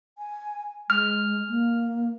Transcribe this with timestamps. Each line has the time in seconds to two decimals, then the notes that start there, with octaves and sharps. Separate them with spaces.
0.18 G#5
0.90 G#3 F6
1.49 A#3